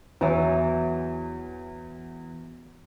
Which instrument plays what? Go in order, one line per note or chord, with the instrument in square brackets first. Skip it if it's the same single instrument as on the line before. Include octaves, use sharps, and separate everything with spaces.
[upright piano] E2 [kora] E3 F#3